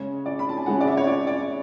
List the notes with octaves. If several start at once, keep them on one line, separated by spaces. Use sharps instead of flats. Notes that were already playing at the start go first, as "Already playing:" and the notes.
Already playing: C#3 G#3 C#4 C#5
D5
B5
A5
G#5
C#3 G#3 C#4 F#5
D5
E5
C#5
D5
D5